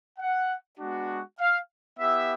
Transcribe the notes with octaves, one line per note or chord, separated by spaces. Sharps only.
F#5
G#3 B3 D4 F#4
F5
B3 E4 G4 E5